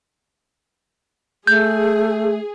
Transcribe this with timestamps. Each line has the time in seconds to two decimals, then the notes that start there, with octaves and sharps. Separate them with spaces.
1.47 A3 G#4 G6